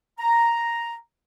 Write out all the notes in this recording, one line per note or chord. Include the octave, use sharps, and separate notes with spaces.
A#5